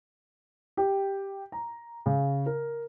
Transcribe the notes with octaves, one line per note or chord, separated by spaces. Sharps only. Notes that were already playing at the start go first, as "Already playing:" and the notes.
G4
A#5
C#3
A#4